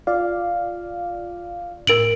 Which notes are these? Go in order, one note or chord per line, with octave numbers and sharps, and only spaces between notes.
F4 D5 F5
A2 A#4 D7 F#7